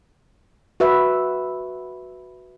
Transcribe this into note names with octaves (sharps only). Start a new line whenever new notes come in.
F#4 B4 E5